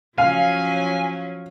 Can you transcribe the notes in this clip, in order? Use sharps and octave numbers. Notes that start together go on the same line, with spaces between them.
F3 F#3 C#4 F5 G#5